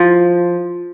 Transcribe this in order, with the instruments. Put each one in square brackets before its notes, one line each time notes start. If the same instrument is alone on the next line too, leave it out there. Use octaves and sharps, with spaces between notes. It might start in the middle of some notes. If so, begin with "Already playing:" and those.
Already playing: [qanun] F3